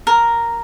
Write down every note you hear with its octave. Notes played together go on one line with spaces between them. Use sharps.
A#4